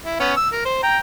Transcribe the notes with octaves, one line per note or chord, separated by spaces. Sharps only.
E4
B3 C#4
E6
A#4
C5
G5 A#5